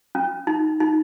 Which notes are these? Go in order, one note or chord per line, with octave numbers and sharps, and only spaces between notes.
C#4
D#4
D#4